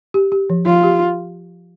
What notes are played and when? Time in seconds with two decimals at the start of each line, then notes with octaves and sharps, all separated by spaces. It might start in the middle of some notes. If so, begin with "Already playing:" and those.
0.14 G4
0.32 G4
0.50 F3
0.66 F3 F4
0.83 G4